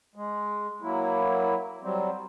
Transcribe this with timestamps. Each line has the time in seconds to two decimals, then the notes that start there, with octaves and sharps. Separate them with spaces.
0.15 G#3
0.82 F#3 A#3 E4
1.82 F#3 G3 C4